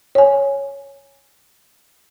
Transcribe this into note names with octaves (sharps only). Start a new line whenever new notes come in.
C#5 G#5